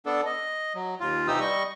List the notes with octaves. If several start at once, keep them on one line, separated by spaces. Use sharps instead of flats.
B3 D4 A4
D#5
F#3
D#2 F4
C3 E3 D#4 G4 D#6 E6
G3 D#5 C#6